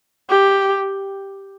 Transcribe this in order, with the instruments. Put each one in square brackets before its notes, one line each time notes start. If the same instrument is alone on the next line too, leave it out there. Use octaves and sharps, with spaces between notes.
[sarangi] G4